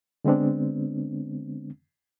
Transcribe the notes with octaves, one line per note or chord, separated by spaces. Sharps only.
D3 G#3 B3 C4 D4